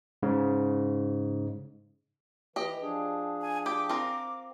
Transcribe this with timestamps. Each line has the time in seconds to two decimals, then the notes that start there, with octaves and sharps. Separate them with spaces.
0.23 G#2 C#3
2.56 E3 G4 D#5
2.82 F3 D4 G#4
3.41 G#5
3.66 G4 D6
3.89 C4 F4 A#4